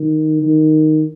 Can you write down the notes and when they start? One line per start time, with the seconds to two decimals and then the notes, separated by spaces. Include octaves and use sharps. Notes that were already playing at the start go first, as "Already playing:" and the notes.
Already playing: D#3
0.42 D#3